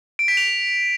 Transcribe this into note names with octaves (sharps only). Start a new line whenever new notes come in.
D7
B6
F7